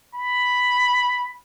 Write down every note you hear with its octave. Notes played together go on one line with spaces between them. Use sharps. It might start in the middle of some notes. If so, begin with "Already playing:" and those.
B5